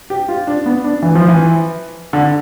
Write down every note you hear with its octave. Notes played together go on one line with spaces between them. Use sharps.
G4
F4
D4
B3
D4
E3
F3
E3
D3